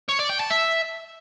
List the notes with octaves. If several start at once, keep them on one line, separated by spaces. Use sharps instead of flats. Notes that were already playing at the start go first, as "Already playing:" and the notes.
C#5
D5
G5
A5
E5